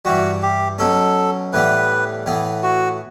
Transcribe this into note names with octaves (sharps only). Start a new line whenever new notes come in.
G2 E3 G3 F#4
G4
B2 F#3 C#4 A4
A2 E3 G3 B3 B4
A2 E3 B3
F#4